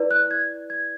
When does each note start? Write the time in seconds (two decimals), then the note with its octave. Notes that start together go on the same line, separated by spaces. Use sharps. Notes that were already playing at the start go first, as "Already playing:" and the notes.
Already playing: E4 B4 D5
0.11 F#6
0.31 G#6
0.70 G#6